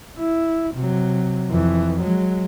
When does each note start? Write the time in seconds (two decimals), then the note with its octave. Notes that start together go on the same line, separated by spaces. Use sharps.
0.19 E4
0.75 C3 F#3
1.51 F2 E3
2.01 F#3 G#3